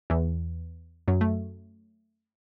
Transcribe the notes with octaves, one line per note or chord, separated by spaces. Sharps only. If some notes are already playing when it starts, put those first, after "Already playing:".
E2 E3
F#2 F#3
A3